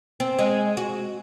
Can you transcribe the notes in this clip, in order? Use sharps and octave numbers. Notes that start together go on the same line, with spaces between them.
C4
G#3
F#4